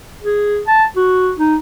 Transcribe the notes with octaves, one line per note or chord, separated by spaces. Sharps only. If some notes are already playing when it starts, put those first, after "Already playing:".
G#4
A5
F#4
D#4